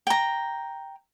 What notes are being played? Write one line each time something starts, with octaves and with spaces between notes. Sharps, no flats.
G5 A#5